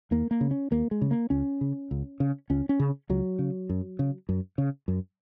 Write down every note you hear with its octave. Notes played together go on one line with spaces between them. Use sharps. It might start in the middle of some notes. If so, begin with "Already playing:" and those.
D#2 A#3
A#3
C#3
C#4
D#2 A#3
G#3
C#3
A#3
C#2 C#4
C#3
C#2
C#3
C#2 C#4
C#4
C#3
C#2 F#3
C#3
F#2
C#3
F#2
C#3
F#2